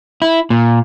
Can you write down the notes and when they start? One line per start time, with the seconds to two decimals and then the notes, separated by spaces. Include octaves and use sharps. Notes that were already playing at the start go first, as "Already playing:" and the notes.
0.22 E4
0.50 A#2